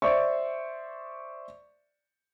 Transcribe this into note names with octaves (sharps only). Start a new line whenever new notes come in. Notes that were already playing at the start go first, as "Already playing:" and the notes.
C5 D5 E5 C#6